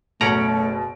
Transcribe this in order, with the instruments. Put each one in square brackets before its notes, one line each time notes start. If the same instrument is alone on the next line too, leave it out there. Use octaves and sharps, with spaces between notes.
[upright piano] F#1 B2 D7 [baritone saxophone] A3 [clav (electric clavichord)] C#4 F#5 A#5